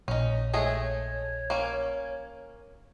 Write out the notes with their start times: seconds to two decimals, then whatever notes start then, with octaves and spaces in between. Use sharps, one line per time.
0.08 A#1 C#4 D#4
0.53 G#3 A3 G#4 C#5
1.50 A#3 C#4